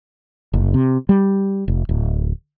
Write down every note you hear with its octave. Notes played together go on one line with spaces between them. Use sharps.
F#1
C3
G3
F1
D1